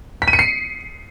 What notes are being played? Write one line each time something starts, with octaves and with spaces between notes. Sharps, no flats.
B6
D#7
C#7
C7